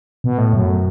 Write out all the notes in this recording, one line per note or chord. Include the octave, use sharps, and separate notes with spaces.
B2
A2
F#2